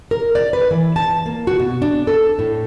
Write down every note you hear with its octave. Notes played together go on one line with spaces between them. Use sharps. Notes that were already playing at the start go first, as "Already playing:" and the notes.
A#4
D5
B4
E3
A5
A#3
F#4
B2
D4
A4
A2